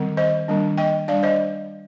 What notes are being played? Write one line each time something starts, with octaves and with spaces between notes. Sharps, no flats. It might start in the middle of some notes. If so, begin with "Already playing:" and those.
Already playing: D#3 G3 C4
C5 D#5
D#3 G3 A#3 D4
D#5 G5
G3 D4 D5 F5
C5 D#5